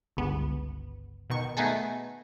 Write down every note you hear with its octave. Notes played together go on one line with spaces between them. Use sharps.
G1 C#2 B3
B2 D#3 C#6
A3 B3 D#4 F#4 G#4 A4